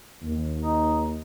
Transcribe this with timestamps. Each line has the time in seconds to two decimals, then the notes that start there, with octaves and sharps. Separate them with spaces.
0.23 D#2
0.61 D#4